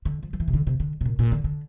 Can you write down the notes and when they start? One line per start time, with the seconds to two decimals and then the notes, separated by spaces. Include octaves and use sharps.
0.05 D3
0.23 F3
0.33 F3
0.40 E3
0.48 C3
0.53 D3
0.67 C3
0.80 D3
1.01 C3
1.05 A#2
1.19 A#2
1.32 D3
1.44 D3